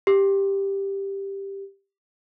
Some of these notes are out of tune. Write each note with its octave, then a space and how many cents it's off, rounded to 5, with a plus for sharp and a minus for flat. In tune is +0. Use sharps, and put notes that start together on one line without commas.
G4 +5